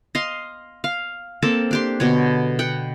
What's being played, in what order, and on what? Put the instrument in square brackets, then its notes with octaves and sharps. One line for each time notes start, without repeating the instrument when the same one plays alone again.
[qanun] D#5 F5 C6
F5
A#3 C4 A4 A5
D4 G4 C6
B2 D3 C#5
F#5 G5